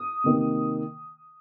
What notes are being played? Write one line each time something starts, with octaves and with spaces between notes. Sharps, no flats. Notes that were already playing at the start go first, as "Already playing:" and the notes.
Already playing: D#6
C3 D#3 A#3